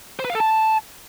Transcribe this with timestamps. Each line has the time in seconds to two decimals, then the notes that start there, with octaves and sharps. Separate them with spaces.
0.19 C5
0.25 B4
0.30 F5
0.35 A4
0.40 A5